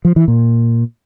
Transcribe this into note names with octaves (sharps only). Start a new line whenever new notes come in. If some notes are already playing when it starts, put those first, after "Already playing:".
F3
E3
A#2